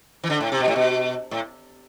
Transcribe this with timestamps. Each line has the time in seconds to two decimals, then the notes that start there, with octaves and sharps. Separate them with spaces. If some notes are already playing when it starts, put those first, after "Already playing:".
0.24 E3
0.30 D3
0.40 A2
0.52 C3
0.60 B2
0.68 A2
0.76 B2
1.31 A2